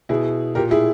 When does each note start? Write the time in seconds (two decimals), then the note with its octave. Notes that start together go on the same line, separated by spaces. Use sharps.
0.09 B2 E4 G#4
0.55 A#2 G4 A#4
0.71 E4 G#4